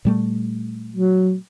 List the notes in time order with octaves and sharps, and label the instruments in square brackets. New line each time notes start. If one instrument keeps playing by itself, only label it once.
[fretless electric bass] A#2 G3 A3
[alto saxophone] F#3